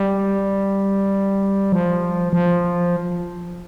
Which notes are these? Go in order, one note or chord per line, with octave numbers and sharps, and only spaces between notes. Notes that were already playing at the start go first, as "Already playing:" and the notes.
Already playing: G3
F3
F3